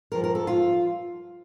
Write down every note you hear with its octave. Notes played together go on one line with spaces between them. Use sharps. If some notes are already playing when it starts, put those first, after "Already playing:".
G2 F3 A#4
A#4
A4
F4